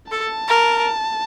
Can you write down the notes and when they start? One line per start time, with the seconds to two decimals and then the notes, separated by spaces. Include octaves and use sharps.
0.11 A4 A5
0.48 A#4